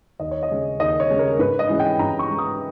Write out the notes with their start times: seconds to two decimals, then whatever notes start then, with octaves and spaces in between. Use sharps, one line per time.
0.19 D#2 D#5
0.31 C#5
0.43 D#5
0.50 C#3 G#3 C#4
0.80 D#2 D#5
1.00 C#5
1.09 C#3 G#3 C#4
1.19 A#4
1.39 G#2 B4
1.59 D#5
1.69 E3 G#3 C#4
1.79 G5
1.99 G#2 A#5
2.19 C#6
2.29 E3 G#3 C#4
2.39 D#6